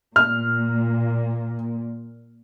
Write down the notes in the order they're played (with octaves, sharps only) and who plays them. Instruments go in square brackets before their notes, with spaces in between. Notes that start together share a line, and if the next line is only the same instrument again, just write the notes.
[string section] A#2 [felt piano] F6